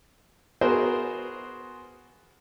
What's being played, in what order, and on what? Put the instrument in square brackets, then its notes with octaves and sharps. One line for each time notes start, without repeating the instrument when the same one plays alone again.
[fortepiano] B3 F#4 G#4 A#4 C5